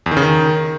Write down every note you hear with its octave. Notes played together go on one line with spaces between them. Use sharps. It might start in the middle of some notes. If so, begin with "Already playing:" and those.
E2
D#3
C#3
D#3